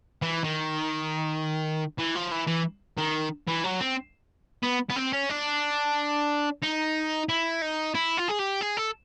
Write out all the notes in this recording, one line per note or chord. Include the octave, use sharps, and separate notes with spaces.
E3
D#3
E3
F3
E3
E3
D#3
E3
F#3
C4
B3
B3
C4
C#4
D4
D#4
E4
D#4
E4
F4
G#4
G4
G#4
A4